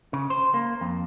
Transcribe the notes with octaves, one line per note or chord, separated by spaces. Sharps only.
C#3
C5
A#3
F2